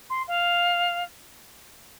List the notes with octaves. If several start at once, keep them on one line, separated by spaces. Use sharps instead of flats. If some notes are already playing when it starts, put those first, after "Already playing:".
C6
F5